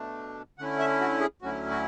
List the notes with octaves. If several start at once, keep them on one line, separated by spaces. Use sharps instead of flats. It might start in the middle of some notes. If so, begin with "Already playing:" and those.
Already playing: B2 A3 D4
D3 A3 C#4 E4 F#5
E5
F#4
G#4
D2 D3 F#3 C#4 E4 F#4
F#4